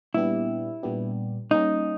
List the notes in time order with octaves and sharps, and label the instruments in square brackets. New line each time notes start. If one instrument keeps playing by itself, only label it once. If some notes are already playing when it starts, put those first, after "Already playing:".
[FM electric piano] A#2 G3 B3 D4 G4 [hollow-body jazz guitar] E4
[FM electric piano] A#2 G3 B3 D4 G4
[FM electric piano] G3 A#3 C#4 [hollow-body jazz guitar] D#4